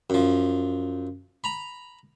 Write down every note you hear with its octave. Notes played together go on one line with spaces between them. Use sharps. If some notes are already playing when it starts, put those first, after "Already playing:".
F#2 F3
A#5 B5